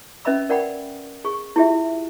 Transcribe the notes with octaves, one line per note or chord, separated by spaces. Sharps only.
C#4 B4 D#5 E5 B5 E6
A#4 D5 F#5 G5 B5
G#4 C#6
E4 F4 G4 G#4 E5